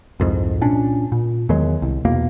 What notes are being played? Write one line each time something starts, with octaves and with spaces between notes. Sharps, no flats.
C2 F2 G#2
A#2 C#4 D4
A#2
E2 D#3 F#3 G#3
C2
B1 E2 B2 A#3